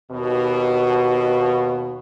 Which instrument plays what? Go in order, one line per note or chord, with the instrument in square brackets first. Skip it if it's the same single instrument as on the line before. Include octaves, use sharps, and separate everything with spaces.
[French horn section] D#2 B2